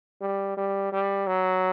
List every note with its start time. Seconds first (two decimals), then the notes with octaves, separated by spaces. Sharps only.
0.22 G3
0.57 G3
0.92 G3
1.27 F#3